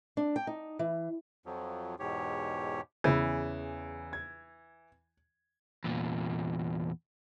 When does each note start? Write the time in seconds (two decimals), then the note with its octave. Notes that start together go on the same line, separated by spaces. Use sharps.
0.17 D4
0.36 G5
0.47 D#4
0.79 E3
1.46 F2 F3 F#3
2.00 E2 G#2 B2 G4 C#5
3.04 E2 C#3 E3
4.13 G#6
5.84 E2 A#2